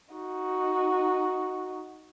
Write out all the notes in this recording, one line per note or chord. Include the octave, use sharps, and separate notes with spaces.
D#4 F#4